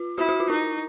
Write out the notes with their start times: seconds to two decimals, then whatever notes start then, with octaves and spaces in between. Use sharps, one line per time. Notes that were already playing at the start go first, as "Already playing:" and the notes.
Already playing: F4
0.18 E4 F#4
0.29 F#4
0.40 F4
0.50 D#4 E4